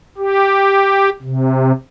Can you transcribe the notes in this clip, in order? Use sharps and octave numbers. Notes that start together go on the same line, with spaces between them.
G4
C3